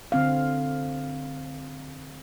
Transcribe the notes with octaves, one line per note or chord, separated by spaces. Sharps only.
D3 C4 F5